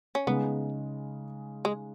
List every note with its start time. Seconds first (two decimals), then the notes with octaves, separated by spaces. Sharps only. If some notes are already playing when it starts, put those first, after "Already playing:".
0.15 C#4
0.27 C#3 G#3 B3 D#4
1.65 G#3